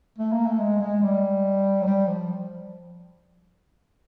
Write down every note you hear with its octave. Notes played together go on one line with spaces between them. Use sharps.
A3
A#3
A3
G#3
G#3
G3
F#3
G3
F3